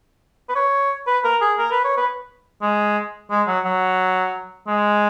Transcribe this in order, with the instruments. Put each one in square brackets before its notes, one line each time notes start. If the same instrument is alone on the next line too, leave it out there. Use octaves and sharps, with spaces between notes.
[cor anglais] B4
C#5
B4
A#4
G#4
A#4
B4
C#5
B4
G#3
G#3
F#3
F#3
G#3